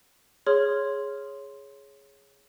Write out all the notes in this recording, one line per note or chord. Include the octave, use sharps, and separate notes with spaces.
G#4 C#5 C6 F6